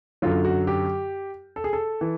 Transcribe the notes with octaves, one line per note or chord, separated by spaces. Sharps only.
F#2 D3 F#3 F4
F#4
G4
A4
G#4
A4
E3